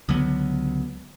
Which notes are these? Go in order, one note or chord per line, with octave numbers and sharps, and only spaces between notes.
C#2 D3 F#3 B3